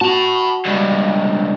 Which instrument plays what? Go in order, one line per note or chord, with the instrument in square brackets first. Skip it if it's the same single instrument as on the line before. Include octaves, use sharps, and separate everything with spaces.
[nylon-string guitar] F#4 [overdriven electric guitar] A5 B5
[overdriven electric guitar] C#2 G2